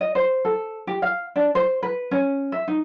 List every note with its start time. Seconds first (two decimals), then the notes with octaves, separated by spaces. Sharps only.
0.01 D#5
0.15 C5
0.45 A4
0.87 G4
1.02 F5
1.36 D4
1.55 C5
1.83 B4
2.11 C#4
2.52 E5
2.68 D#4